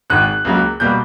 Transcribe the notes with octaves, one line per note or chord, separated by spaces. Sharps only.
G#1 G#2 D#3 F#6
C#2 C#3 F#3 A#3
B2 G3 A#3 G6